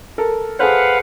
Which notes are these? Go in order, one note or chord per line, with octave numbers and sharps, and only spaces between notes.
A4 A#4
G#4 A4 B4 C5 F5 F#5